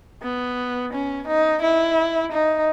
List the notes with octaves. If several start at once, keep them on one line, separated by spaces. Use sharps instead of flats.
B3
C#4
D#4
E4
D#4